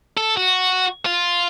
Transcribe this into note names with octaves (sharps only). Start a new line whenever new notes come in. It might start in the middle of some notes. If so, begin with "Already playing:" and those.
A4
F#4
F4